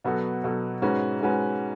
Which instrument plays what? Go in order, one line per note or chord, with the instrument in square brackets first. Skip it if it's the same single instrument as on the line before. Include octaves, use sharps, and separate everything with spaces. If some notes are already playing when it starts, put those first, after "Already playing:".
[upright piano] B2 F#3 B3 F#4 A4
B2 F#3 B3 F#4 A4
G#2 G#3 C#4 F#4 B4
G#2 G#3 C#4 F#4 B4